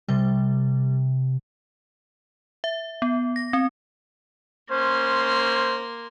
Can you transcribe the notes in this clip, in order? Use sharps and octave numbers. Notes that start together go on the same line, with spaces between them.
C3 G3
E5
B3
A#6
C4
A#3 C#4 C5 C6